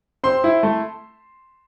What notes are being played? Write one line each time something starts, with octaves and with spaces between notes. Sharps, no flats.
C4 C6
E4
A3